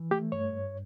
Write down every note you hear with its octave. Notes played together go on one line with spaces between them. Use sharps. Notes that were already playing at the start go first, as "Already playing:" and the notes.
Already playing: E3
A3 G4
G2 C#5
G2